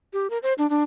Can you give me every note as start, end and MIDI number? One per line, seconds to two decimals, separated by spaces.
0.13 0.30 67
0.30 0.38 70
0.43 0.53 72
0.58 0.69 62
0.70 0.83 62